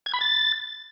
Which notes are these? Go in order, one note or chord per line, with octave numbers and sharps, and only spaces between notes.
G#6
B5
A6